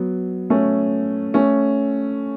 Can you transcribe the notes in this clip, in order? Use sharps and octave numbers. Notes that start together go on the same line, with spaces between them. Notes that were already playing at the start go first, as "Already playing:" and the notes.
Already playing: F#3 B3
A3 C#4
A3 C#4